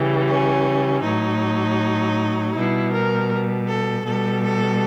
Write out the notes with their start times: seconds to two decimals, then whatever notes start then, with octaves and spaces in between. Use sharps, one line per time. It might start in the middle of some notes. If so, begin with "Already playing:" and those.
Already playing: C#3 E3 G3
0.27 C#4
1.02 A2 F#3 D#4
2.54 B2 G3 E4
2.92 A#4
3.67 A4
4.05 B2 G3 A4
4.43 A4